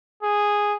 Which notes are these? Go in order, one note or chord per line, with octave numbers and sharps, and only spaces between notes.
G#4